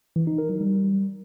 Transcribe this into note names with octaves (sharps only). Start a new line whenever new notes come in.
E3
D#4
A#4
F#3
G3